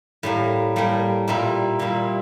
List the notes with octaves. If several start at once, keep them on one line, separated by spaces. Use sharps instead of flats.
A2 G3 A#3
A2 G3 A#3
A#2 G3 A#3 E4
A#2 G3 A#3 E4